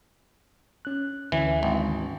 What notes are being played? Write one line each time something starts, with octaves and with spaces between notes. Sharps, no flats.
C#4 F#6
D2 D3 E3 C#4
G#1